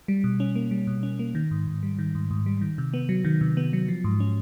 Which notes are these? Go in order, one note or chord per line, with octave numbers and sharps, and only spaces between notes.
G3
B2
C#4
A#3
G3
B2
C#4
A#3
D#3
G#2
G#2
G3
D#3
G#2
G#2
G3
D#3
C3
B3
F#3
D#3
C3
B3
F#3
F3
G#2
C#4